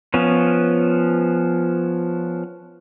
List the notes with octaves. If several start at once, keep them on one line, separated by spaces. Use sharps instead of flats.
F3 B3 C#4